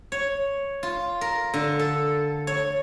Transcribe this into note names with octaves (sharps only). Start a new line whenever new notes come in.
C#5
F4
A#4
D3
A4
C#5